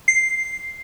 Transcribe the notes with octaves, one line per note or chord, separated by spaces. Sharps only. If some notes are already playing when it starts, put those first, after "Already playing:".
C7